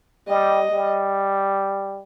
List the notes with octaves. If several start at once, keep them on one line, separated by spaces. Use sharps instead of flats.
G3 D#5
G3